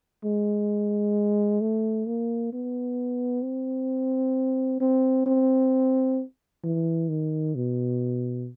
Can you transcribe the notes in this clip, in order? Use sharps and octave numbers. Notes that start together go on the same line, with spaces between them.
G#3
A3
A#3
B3
C4
C4
C4
E3
D#3
B2